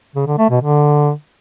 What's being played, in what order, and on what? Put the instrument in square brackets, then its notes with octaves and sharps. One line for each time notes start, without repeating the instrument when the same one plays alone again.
[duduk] C#3
D3
A3
B2
D3